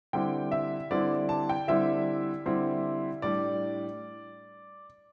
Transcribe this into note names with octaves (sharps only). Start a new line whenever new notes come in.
D3 G3 C4 E4 G5
E5
D3 G3 C4 E4 D5
A5
G5
D3 G3 C4 E4 E5
D3 G3 C4 E4
A2 G3 D4 D5